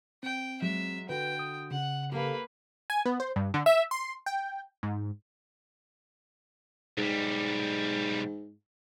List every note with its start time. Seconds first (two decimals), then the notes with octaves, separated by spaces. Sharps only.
0.23 C4 G5
0.62 F#3 G#3 E5
1.09 D3 F#4 B4 G5
1.39 D#6
1.71 C#3 F#5
2.12 A#3 G4 A4 B4 F5
2.90 G#5
3.05 B3
3.20 C5
3.36 G2
3.54 D3
3.66 E5
3.91 C6
4.26 G5
4.83 G#2
6.98 B1 G#2 G3